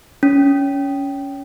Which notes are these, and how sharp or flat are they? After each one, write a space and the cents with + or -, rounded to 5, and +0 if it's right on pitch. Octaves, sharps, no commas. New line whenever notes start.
C#4 +15